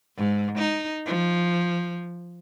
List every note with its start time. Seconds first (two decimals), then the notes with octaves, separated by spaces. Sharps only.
0.17 G#2
0.58 D#4
1.06 F3